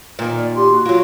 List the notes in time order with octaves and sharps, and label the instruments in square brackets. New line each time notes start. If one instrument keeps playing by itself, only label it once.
[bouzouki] A#2 D#3
[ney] D5
[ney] G4 [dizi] C6
[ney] F#4
[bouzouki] F#3 A#3 [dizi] F4